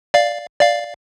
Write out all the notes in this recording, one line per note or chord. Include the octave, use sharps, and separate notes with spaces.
D5 F5
D5 F5